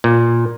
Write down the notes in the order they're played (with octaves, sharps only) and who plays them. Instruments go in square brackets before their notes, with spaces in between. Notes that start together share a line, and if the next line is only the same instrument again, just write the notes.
[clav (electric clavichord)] A#2